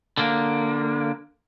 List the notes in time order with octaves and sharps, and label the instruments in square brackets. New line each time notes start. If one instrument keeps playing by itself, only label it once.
[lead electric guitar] D3 A#3